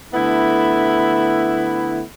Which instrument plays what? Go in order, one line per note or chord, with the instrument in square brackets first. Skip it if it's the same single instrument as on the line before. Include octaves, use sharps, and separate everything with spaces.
[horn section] D3 A3 B3 E4